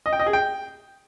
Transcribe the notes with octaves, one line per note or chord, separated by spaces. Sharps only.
D#5
G5
D#5
G#4
G5